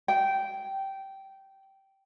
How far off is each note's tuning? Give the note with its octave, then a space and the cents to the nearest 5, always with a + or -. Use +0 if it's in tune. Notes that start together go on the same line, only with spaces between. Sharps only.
G5 -15